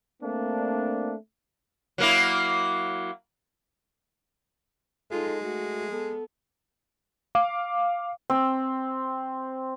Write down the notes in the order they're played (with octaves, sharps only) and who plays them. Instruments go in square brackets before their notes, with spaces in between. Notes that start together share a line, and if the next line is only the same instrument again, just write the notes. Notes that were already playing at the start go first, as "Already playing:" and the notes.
[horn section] A3 A#3 C4 D4
[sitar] F#3 A#3 E4
[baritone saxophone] G#3 [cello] D#4 F4 [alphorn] A4
[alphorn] A3 [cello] F#4
[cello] B3 [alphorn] A4
[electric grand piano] F5 D6
[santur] C4